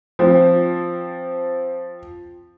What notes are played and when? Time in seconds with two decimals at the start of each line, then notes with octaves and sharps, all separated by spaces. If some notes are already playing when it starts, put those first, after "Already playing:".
0.19 F3 C4